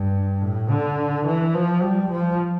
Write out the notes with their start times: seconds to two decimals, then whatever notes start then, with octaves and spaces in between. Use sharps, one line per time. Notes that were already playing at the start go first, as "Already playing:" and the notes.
Already playing: G2
0.41 A2
0.70 D3
1.26 E3
1.54 F3
1.82 G3
2.10 F3